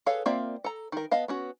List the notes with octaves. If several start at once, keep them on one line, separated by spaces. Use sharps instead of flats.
G#4 A4 B4 C#5 F5
A#3 C4 F4 D5 E5
A4 A#5
D#3 A#4
B3 D#5 F5 A5
B3 C#4 F#4